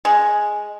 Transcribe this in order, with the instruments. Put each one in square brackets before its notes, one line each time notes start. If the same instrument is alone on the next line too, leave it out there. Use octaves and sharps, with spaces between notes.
[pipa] G#3